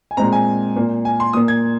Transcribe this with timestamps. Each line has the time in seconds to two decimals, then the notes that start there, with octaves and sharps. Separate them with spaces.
0.11 G#5
0.17 A#2 G#3 C4 A#5
0.32 G#5
0.76 A#2 A#3
1.05 G#5
1.20 C6
1.33 A#2 A#3 D#6
1.48 G#6